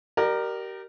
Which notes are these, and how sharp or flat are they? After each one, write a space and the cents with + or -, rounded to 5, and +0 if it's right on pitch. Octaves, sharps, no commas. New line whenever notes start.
G4 -30 A#4 +0 D5 +35